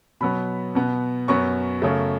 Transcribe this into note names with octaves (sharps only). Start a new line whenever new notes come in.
B2 F#3 B3 B5
B2 B3
F#2 F#3 B3 C#6
F#2 C#3 A3